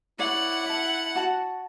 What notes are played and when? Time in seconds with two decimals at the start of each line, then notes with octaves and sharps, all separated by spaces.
0.19 E4 C#5 D5 F#5
0.66 E5 A5
1.16 F#4 A5